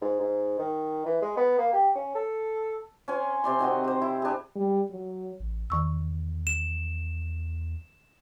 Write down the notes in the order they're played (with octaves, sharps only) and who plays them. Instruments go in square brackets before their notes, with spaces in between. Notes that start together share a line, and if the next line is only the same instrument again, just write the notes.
[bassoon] G#2
G#2
D#3
E3
G#3
B3
A#3
G4
C#4
A4
[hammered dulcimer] C#4 C5 G#5
C3 D5 C6
D#3 C4 F#4 D#5
G4 C5
E4
D4 G#4
[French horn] G3
F#3
[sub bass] A1
[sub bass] E2 [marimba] D#3 C#6 E6
[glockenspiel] E7